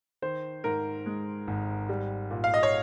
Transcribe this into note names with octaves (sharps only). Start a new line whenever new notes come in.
D#3 C5
G#2 A#4
G#3
G#1
G3
A#2
F5
D#5
C#5